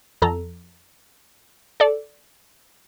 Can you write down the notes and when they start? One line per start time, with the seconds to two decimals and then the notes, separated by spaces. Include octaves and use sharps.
0.22 F2 A4 A#5
1.80 A4 D5